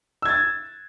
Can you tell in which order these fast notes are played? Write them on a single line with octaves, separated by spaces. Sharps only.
E6 G#6 A6